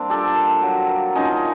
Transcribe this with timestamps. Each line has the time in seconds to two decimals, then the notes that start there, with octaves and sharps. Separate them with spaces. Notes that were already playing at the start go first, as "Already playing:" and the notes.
Already playing: G3 A#3 C4 D4
0.10 F3 G4 A4
0.36 A#3
0.62 F#3
0.89 A#3
1.15 F3 C#4 D#4